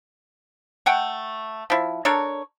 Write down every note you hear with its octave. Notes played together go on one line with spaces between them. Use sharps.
A3 F#5 G5
F3 E4
D4 A4 A#4 C#5